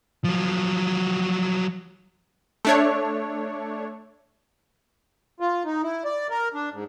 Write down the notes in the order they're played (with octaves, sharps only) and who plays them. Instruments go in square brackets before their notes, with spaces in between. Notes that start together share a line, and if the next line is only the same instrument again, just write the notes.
[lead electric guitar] F3 F#3
[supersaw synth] A3 D4 C#5
[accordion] F4
D#4
E4
D5
A#4
D4
G#2